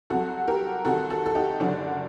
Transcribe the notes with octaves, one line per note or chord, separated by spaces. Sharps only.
C2 C3 F#3 F#4 A4
G4 A#4
C2 C3 D#3 F#4 A4
F#4 A4
A4
D#4 G4
F#1 F#2 D3 F#3 D4 F#4